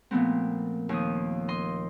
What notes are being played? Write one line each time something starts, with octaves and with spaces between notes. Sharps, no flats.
A#2 F3 A3 B3 C4
D#2 F3 D#6
D#5 C6